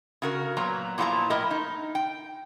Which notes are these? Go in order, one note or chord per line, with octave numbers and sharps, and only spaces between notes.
C#3 F#4 A#4
A#2 F#3 B3 A#5
A#2 F3 E4 F#4 A5 A#5
A2 E4 A#4 D#5
D#4
G5